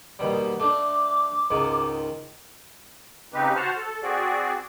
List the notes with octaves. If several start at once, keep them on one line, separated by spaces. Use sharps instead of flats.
D#2 B2 G3
A3 D4 D6
C#2 G#2 D#3
C#3 C4 D#4 G4 B4
F#4 C5 F#5 A5 F6
A4
C4 F#4 G#4 D5